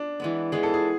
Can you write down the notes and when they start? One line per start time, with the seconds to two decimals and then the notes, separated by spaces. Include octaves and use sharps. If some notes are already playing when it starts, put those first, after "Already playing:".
Already playing: D4
0.20 E3 G#3 B3
0.52 E3 G#3 B3 G#4
0.63 A4
0.74 G#4